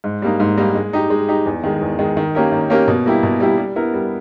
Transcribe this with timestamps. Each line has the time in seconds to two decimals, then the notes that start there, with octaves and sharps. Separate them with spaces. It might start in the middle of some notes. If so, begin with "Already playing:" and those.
0.04 G#2
0.22 G3 A#3 D#4
0.40 G#2
0.58 G3 A#3 D#4
0.75 G#3
0.93 D#4 G4
1.10 G#3
1.29 D#4 G4
1.46 E2
1.64 D#3 G#3
1.81 E2
1.99 D#3 G#3
2.17 D#3
2.35 A#3 C#4 G4 A#4
2.52 D#3
2.70 A#3 C#4 G4 A#4
2.88 B2
3.06 G3 A#3 E4 G4
3.23 B2
3.40 G3 A#3 E4 G4
3.58 G3
3.76 B3 E4 A#4
3.94 G3